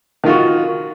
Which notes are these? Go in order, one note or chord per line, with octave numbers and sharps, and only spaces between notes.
D#3 F4 F#4